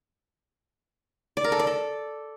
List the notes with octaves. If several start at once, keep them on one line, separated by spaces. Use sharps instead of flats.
D5
A#4
A4
D5
A4